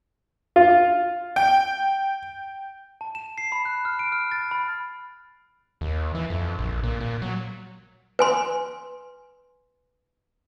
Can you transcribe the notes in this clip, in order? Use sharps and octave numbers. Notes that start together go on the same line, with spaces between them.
F4
G5
A5
E7
C7
B5
F#6
F6
D7
F6
A6
B5
D#2
E3
F2
A#1
A#2
A#2
F#3
B4 G#5 C6